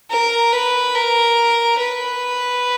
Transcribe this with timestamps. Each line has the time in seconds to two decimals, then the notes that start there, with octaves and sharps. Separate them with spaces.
0.10 A#4
0.52 B4
0.95 A#4
1.78 B4